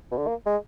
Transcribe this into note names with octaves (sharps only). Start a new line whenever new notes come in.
B2
D3
A#3
G#3